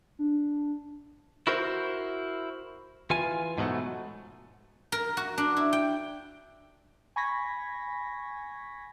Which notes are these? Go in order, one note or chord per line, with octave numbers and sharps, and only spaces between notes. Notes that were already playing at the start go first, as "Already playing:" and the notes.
D4
E4 F#4 A#4 C5
E3 F4 G#5
G#2 B2 F#3 A3
A#4
F#4
D4
E4
G5
G#5 B5 C#6 G#6 A#6 B6